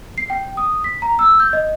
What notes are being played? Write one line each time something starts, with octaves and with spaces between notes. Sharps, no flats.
C7
G5
D#6
B6
A#5
E6
G6
D#5